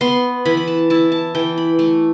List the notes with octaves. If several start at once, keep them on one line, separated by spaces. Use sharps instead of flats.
B3 C6
E3 B5
B5
A5
E4 A5
A5
E3 G5
B5
A3